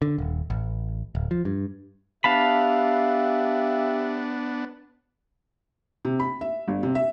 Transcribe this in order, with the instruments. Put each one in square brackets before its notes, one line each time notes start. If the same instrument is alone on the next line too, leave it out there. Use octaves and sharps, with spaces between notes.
[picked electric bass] D3
D#1
A1
D1
F3
G2
[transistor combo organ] B3 D4 [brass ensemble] G4 E5 [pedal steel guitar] F5 A5 B5
[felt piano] C3
B5
E5
G1
C3
E5